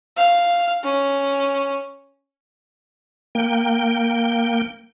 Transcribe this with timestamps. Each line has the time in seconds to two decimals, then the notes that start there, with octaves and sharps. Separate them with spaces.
0.17 F5
0.84 C#4
3.35 A#3 G5